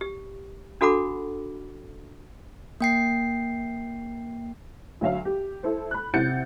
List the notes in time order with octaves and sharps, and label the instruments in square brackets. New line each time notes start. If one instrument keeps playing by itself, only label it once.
[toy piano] G4
D4 F#4 A4 F#5 B5 D6
[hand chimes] A#3 G5 C7
[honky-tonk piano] D2 F#3 E5 F5
G4
E4 A4 C5
B5 F#6
C3 E4 F#5 G6 A6 C#7